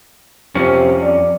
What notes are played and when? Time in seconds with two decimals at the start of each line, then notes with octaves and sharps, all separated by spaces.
0.55 F2 C3 C#4
1.02 D5